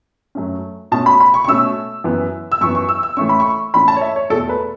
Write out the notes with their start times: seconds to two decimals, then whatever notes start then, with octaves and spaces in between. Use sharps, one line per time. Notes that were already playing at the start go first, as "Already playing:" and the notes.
0.35 F#2 F#3 A3 C#4
0.92 B2 A3 C#4 A5
1.06 B5
1.20 B5
1.34 C#6
1.44 C#6
1.48 B2 A3 C#4 E6
2.04 F#2 E3 B3
2.52 E6
2.61 F#2 E3 B3 C#6
2.75 C#6
2.89 E6
3.03 E6
3.17 A2 E3 A3 C#4 C#6
3.29 B5
3.40 C#6
3.74 A2 E3 A3 C#4 B5
3.88 A5
3.97 C#5
4.01 E5
4.16 C#5
4.30 E2 B2 A3 A4
4.49 B4